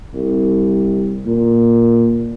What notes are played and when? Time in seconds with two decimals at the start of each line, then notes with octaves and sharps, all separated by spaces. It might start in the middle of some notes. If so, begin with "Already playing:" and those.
0.14 C2
1.26 A#2